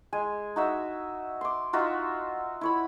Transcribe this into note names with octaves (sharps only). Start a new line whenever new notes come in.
G#3 G#5
D#4 F#4 E5
C6 D6
D#4 F4 F#4 E5
E4 C#5 B5